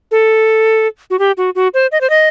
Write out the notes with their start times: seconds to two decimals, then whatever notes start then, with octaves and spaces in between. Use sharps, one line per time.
0.11 A4
1.10 F#4
1.19 G4
1.37 F#4
1.55 F#4
1.74 C5
1.92 D#5
2.01 C5
2.10 D#5